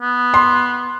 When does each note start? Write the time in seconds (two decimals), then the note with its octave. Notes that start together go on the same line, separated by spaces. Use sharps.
0.02 B3
0.34 C6